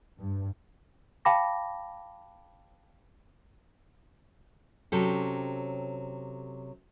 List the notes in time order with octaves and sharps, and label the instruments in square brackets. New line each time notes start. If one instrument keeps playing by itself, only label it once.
[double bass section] G2
[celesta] F5 G5 A5 B5 D6 A#6
[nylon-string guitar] C3 F#3 C#4 G4 A4